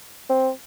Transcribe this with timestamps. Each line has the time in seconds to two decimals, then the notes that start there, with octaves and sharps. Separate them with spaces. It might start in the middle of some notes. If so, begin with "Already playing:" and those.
0.30 C4